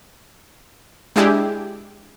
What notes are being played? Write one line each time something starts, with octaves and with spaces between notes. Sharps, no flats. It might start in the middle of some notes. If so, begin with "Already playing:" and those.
G#3 D4 E4 G4 G#4